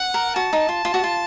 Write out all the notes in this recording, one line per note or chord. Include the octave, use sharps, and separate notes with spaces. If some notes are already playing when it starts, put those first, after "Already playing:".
Already playing: F#5
A#4
F#4 A5
D#4
F4
F4
F#4
F4